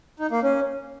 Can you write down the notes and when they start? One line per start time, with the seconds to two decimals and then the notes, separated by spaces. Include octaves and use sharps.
0.19 D#4
0.31 A#3
0.43 C#4